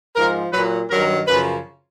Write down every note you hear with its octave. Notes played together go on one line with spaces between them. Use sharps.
G#2 F3 A#4
A#2 F#3 B4
G2 D#3 F#3 A#4
F#2 C#3 F3 B4